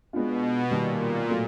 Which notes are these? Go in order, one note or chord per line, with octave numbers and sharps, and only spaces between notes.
B2 G#3 B3 D4 F4
A#2 D#3 G3 A#3
A2 F#3 A3